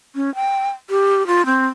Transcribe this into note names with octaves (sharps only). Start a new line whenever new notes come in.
C#4
G5
G4
F4
C4